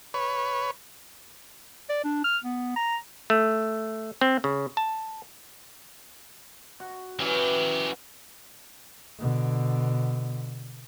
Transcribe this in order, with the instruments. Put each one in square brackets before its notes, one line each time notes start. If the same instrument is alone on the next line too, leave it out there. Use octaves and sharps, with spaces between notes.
[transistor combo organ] B4 C#5
[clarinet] D5
D4
F6
B3
A#5
[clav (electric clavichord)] A3
C4
C#3
A5
[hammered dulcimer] F#4
[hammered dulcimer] E3 C#4 [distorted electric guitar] F#3 G4
[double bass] B2 D3